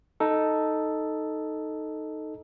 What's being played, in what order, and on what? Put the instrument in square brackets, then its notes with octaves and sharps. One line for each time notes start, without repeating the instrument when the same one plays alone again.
[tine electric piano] D#4 A4